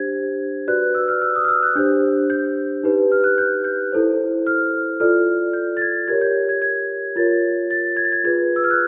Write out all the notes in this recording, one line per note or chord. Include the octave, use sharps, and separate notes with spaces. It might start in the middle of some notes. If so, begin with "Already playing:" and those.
Already playing: D4 G4 C5 G#6
F#4 B4 D5 F#6
E6
F6
E6
D#6
F6
E6
F#6
D4 G4 C5 G6
G6
D#4 G4 B4
F6
F#6
G6
G6
E4 A4 C5
F6
F4 A4 D5 F6
G6
A6
G#6
G4 A#4 C#5 G#6
G6
G#6
G#6
F4 A#4 C#5 A6
A6
G#6
A6
G#6
F4 G#4 B4 G#6
E6
F6
F#6